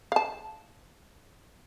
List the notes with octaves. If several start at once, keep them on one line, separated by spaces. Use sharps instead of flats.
F5 A5